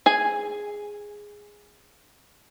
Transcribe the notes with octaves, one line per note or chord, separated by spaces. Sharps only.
G#4 G#5